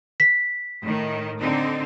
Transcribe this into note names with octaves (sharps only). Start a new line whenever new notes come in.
B6
A2 D#3
D3 C4 D#4